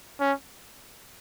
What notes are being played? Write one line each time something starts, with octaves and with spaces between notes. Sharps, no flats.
C#4